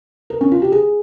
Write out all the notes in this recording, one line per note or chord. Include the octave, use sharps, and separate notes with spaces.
A#4
C#4
F4
G4
G#4